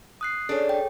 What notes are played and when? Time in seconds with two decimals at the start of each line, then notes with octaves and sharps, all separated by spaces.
0.21 D#6 F#6 C7
0.49 C#4 D4 G#4 A4 C#5
0.69 G5